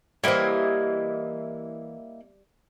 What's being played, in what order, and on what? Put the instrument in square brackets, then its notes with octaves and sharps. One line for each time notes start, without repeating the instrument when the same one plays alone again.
[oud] E3 G4 [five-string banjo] G3 C5 [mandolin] A#3 E4 D#5